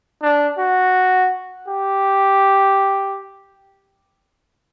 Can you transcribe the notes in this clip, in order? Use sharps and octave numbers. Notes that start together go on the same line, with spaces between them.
D4
F#4
G4